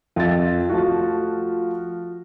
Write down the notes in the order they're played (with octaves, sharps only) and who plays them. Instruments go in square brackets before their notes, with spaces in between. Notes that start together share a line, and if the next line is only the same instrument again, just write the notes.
[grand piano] F2 E5 A6 [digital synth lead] F4
[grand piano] F3 A3 F#4